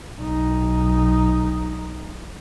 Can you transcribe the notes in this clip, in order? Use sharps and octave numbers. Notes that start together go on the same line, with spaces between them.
B1 D#4